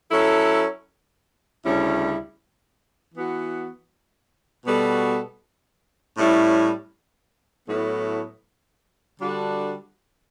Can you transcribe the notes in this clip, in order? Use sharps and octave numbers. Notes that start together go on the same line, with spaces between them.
F#3 C#4 E4 A4
D2 C#3 G3 C#4 E4
E3 B3 F#4
B2 G3 B3 F#4 A4
A2 G3 C#4 E4
A2 F#3 B3 E4 A4
D3 G3 D4 F#4 A4